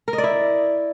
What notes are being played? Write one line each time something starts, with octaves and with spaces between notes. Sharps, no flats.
A#4
D#5
D5
E4